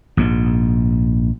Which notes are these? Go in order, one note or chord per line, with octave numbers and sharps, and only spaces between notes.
A#1 G#2